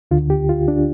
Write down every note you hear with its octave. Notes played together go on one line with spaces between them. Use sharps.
D2 D3 F4
G4
F4
D4